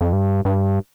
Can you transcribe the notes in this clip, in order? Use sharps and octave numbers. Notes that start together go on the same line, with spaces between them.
F2
G2
G2